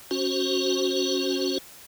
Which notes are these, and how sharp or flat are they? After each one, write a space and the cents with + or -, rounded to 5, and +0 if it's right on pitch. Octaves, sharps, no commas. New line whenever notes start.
C#4 +0 F#4 +0 C5 +15